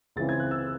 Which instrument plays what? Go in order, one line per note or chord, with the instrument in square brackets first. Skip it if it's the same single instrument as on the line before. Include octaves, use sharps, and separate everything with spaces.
[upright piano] C#2 C#3 E3 C4 A6
G#6
F#6
E6